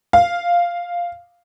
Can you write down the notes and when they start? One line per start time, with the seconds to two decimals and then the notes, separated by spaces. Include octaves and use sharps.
0.13 F5